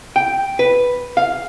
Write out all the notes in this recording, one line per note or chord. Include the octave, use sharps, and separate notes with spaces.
G5
B4
F5